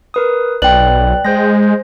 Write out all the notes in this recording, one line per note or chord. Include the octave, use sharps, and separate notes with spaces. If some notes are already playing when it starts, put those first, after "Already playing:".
A#4 B4 D#6
B1 B4 D5 G5 F#6 F#7
G#3 C5 G6 A#6